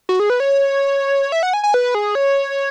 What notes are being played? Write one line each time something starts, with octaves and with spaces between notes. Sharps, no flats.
F#4
G#4
B4
C#5
E5
F#5
G#5
G#5
B4
G#4
C#5